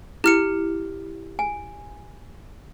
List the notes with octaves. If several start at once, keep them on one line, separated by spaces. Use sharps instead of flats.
E4 G4 F6 C#7
G#5